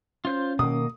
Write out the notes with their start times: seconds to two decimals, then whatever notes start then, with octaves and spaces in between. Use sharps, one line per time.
0.25 C#4 F4 C5 G6
0.59 B2 D#3 A#3 D#6